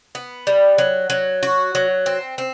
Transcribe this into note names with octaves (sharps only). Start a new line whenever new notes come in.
B3
G3
F#3
F#3
F#4
F#3
C4
C4